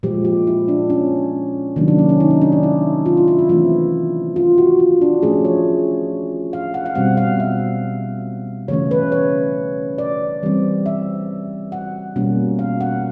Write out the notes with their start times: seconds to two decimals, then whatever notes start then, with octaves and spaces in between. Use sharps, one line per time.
0.03 A#2 F3 G#3 G4
0.25 G4
0.47 E4
0.68 D4
0.90 C#4
1.76 C3 D#3 F#3 A#3 C#4 D4
1.88 D4
1.99 C#4
2.09 C#4
2.20 D#4
2.31 C#4
2.42 D4
2.52 D4
2.63 E4
3.06 F4
3.17 E4
3.28 E4
3.39 F4
3.49 E3 A3 C4 E4
4.36 F4
4.58 F#4
4.79 F4
5.01 D4
5.22 F3 A3 C#4 G#4
5.45 C#5
6.53 F5
6.74 F#5
6.86 F5
6.95 B2 G3 C4 F#5
7.17 F5
7.40 E5
8.68 C#3 E3 A3 C#4 C#5
8.91 B4
9.12 C#5
9.98 D5
10.43 E3 G3 C4
10.86 E5
11.72 F#5
12.16 B2 G3 A#3 C#4
12.59 F5
12.81 F#5